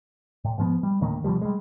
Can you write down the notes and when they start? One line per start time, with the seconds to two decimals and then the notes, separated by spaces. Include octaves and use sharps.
0.44 A2
0.58 G#2 F3 B3
0.83 G3
1.01 D2 A2 D#3 A#3
1.24 B2 D3 F3 G3
1.42 G3 G#3